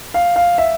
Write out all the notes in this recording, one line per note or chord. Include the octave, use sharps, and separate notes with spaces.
F5
F5
E5